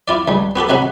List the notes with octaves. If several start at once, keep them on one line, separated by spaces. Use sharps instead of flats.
E4 F4 D5
C#2 G3
B3 F#4 G4 A4
C3 G#3 C#4 F#4 F#5 B5